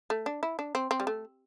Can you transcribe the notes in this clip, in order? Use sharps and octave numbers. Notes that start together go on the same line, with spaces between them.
A3
D4
E4
D4
C4
C4
G3
A3